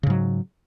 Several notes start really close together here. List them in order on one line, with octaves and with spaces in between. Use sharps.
C#3 G#2 F#3